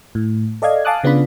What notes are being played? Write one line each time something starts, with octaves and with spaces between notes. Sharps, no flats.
A2
A4 D5 D#5 F5 G#6
F5 G#5 A5 D6 D#6 F#6
C#3 B3 D4 F4 B5